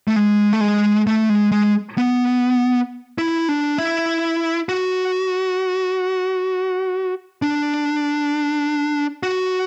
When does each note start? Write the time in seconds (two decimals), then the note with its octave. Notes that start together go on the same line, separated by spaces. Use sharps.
0.08 A3
0.16 G#3
0.53 A3
0.61 G#3
1.07 A3
1.30 G#3
1.52 G#3
1.98 B3
3.18 E4
3.49 D4
3.78 E4
4.69 F#4
7.42 D4
9.23 F#4